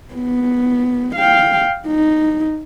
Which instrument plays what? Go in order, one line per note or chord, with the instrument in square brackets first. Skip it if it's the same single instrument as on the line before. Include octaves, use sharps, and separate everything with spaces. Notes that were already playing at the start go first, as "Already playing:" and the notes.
[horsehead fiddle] B3
F5 G5
D#4